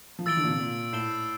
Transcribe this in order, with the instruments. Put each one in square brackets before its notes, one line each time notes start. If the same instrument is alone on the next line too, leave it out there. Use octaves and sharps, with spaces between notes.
[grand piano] F3
[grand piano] E3 [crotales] E6 A6 D7 G7
[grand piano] D3
A#2
C3
A#2
[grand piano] A2 [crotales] G6 C7 E7 G7